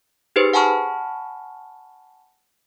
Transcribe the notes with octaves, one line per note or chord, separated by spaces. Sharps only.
D#4 G4 G#4 B4 C5
F#5 G#5 A5 B5 C#6 F6